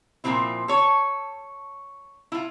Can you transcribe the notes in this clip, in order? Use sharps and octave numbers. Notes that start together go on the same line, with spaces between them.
A#2 C#3 F3 C4 E4
A4 C#5
E4 F4